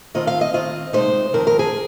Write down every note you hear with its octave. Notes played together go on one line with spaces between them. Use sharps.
D#3 C4 F4 D#5
F5
D#5
D#3 C4 F4 D#5
C3 G#3 D#4 C5
F2 D#3 C4 A#4
A#4
G#4